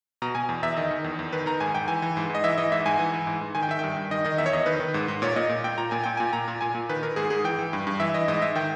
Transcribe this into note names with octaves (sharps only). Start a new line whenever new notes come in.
B2 A#5
B2 G#5
E2
E2 E5
D#3 D#5
D#3
E2
E2
D#3 B4
D#3 A#5
G#2 G#5
G#2 G5
E3 G#5
E3
G#2
G#2
D#5
E3 E5
E3 D#5
G#2 E5
G#2 G#5
E3
E3
G#2
G#2
D#3 G#5
G5
D#3 E5
G2 G5
G2
D#3 D#5
D#3 D#5
E2 E5
C#5
E2 D#5
D#3 B4
D#3
G#2
G#2
A#2 C#5
A#2 D#5
A#2
A#2 G5
A#2 A#5
A#2 G#5
A#2 G5
A#2 G#5
A#2 A#5
A#2
A#2 G#5
A#2
D#3 B4
D#3 A#4
G#2 G#4
G#2 G#4
E3 G5
E3
G2
G2
E3 E5
E3 D#5
G#2 D#5
G#2 E5
D#3 G5